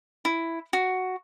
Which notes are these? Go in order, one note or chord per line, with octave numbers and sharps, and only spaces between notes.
E4
F#4